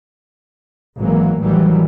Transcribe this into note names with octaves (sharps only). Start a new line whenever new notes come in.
G#1 E3 F#3 A#3
A1 D#3 E3 F#3 G3